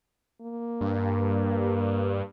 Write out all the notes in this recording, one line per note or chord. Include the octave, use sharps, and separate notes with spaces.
A#3
G2